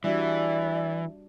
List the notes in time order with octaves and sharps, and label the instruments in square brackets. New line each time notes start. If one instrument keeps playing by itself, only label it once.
[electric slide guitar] E3 [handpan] G3 D4 F#4 [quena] D5 [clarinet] E5